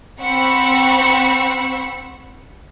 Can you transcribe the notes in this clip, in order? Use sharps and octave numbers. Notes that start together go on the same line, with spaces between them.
C4 F#5 B5 C#6 E6 C#7